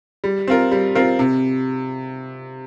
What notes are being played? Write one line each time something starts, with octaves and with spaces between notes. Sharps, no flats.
G3
C4 F4 A#4
G3
C4 F4 A#4
C3